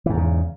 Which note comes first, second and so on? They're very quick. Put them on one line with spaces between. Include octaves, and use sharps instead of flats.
E3 G#2 E2 C#3